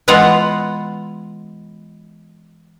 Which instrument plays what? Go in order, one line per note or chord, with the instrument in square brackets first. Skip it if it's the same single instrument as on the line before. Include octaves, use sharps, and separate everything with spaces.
[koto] E3 G#3 B3 F4 F5 F#5